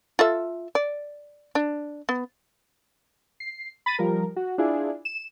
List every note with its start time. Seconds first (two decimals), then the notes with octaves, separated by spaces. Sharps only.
0.19 F4 A4 E5
0.75 D5
1.55 D4
2.09 B3
3.40 C7
3.86 B5 A6 A#6 D#7
3.99 F3 G3 A#4
4.36 F#4
4.58 D4 E4 F4 G#4
5.05 E7